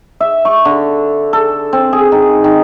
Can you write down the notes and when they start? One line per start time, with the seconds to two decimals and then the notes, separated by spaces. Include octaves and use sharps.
0.20 E5
0.45 C#6
0.65 D3
1.33 A4
1.73 C4
1.93 G#4
2.12 D#3
2.44 D#3